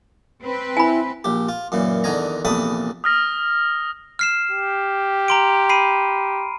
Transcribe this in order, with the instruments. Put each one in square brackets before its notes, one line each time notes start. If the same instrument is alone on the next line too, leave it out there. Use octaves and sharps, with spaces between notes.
[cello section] C4 B4
[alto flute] E4 [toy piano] G#5 B5
[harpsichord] A#1 G4
F4
F#2 A#2 E3
E2 D3 D#3 G#5 A#5
A#1 E2 C3 A4 B5 D#6
[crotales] D#6 F6 A#6
[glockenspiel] F6 C7 E7
[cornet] G4
[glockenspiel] A#5 C6 D7
B5 C7 D#7